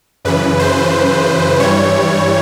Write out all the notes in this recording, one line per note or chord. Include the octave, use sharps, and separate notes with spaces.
F#2 C#3 E3 B4
C5
G2 E3 G3 C#5